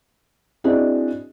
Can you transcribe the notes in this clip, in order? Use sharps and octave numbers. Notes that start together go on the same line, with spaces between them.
C4 D4 E4 F#4 G#4 D#5